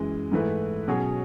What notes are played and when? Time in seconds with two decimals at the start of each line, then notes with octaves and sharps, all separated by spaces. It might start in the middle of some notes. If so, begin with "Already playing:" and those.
Already playing: F#2 E3 G#3
0.32 G#2 E3 A3 E4 B4
0.88 B2 F#3 C#4 G#4 C#5